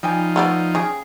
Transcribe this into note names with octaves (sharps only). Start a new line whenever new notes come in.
F3 G3 D#4 G5 G#5
A3 B3 D5
C#3 G3 G4 G#4